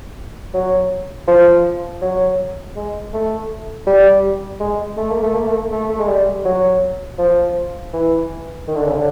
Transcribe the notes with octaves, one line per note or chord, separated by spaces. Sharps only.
F#3
F3
F#3
G#3
A3
G3
G#3
A3
A#3
A3
A#3
A3
A3
A3
G#3
G3
F#3
F3
E3
D#3
D3
C#3
D3